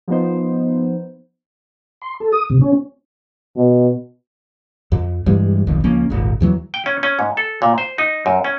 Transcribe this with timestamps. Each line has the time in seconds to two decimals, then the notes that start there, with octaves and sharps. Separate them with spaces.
0.08 F3 B3 D#4 C5
2.02 C6
2.20 A4
2.32 D#6
2.50 C3
2.61 C#4
3.57 B2
4.92 F2
5.26 G2 E3 G3 G#3
5.67 D#1 B1 F2 D#3
5.84 C#2 F3 A#3 C#4
6.10 D#1 G#1
6.41 E2 E3 F#3
6.74 G5
6.86 C#4
7.03 C#4
7.19 G#2
7.37 A4
7.62 A#2
7.78 C5
7.98 D#4
8.26 F#2
8.44 C#4